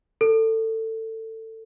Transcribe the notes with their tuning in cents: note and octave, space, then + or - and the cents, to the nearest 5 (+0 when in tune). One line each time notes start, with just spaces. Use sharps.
A4 +20